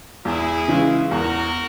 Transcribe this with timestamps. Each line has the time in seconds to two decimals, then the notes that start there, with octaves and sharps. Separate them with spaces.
0.25 E2 E4 G#4
0.68 C#3 E3 G#3 C#4
1.11 E2 F#4 A#4